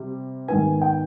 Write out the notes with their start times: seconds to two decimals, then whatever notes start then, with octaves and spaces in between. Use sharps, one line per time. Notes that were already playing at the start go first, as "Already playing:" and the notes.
Already playing: C3 G3
0.48 G#2 D#3 B3 G#5
0.82 G5